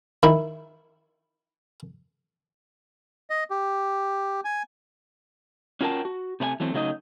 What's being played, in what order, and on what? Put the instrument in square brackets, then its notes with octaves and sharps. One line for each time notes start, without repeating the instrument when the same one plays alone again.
[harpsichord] D#3 E4
[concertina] D#5
G4
G#5
[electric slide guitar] C#4 F4 F#4 A#4 G5 A5
F#4
C3 A3 B4 G#5
E3 F#3 A3 C4
C#3 F#3 A3 D#4 D#5